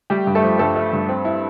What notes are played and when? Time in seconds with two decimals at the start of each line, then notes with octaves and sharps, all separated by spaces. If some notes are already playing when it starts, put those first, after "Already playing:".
0.10 G3 A3 G4
0.27 G2
0.35 A3 A4
0.43 F3
0.59 G2 A3 A4
0.76 A3
0.93 G2
1.09 C4
1.25 E4